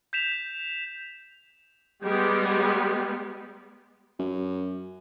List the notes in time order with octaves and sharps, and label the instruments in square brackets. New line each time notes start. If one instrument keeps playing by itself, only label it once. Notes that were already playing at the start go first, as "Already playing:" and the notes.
[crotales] G6 B6 E7 F7
[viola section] G3 G#3 B3
[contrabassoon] F#2